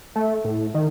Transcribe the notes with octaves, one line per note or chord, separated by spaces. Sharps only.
A3
A2
D#3